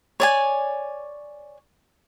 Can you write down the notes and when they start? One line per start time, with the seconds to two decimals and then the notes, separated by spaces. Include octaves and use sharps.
0.20 C#5 D5 G#5